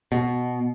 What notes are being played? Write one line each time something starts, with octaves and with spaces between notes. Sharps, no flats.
B2